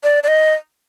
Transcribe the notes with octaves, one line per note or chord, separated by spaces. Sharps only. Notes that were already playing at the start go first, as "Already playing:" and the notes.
D5
D5
D#5